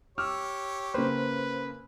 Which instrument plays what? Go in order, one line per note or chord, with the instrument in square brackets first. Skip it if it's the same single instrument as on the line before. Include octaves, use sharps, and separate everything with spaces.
[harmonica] G4 C#5 [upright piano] D6 E6 F6
[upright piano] C#3 A#3 [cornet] B4 [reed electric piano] C5